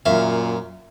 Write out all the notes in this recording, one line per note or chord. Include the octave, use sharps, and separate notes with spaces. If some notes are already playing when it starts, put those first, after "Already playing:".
F#2 A#2 E5 F5